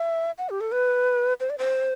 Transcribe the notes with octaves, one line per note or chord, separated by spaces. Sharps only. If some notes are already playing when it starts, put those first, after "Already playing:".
Already playing: E5
F#5
G4
A4
B4
C5
D5
C5